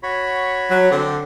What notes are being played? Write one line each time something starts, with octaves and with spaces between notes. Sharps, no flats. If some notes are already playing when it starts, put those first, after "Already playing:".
F#4 C#5 B5
F#3
D3 C4